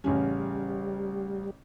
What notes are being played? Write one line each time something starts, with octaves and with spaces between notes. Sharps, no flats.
A1 C#3 G3 C#4